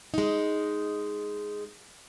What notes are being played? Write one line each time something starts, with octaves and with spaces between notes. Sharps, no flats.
G#3 D#4